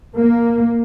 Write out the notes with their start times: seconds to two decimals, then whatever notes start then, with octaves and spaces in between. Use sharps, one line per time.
0.15 A#3